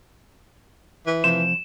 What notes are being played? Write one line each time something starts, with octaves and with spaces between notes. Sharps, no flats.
E3
C3 F3 C5 E7